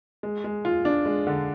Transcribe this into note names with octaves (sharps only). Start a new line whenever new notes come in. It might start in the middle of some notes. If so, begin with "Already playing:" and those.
G#3
G#3
F4
D4
G#3
D3